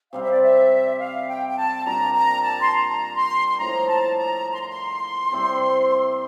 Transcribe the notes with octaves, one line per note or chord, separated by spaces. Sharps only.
C3 G3 C4 F5
E5
D5
E5
F5
G5
G5
A5
A#2 G3 D4 G4 A#5
A#5
A5
C6
A#5
C6
C6
A2 F3 A#3 E4 A#5
A5
A#5
C6
A#5
C6
C3 G3 C4 E4